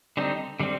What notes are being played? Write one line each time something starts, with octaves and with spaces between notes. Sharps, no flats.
D3 G3 C4 D#4
D3 G3 C4